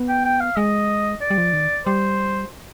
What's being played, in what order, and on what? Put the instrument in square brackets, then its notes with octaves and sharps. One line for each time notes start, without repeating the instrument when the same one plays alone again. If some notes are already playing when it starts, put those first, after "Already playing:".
Already playing: [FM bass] B3
[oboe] G5
G5
F5
[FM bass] G#3 [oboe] D#5
[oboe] D5
[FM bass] G3
F3
D#3
[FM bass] G3 [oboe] C5